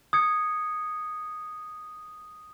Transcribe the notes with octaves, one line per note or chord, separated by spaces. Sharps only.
D#6 G#6 C#7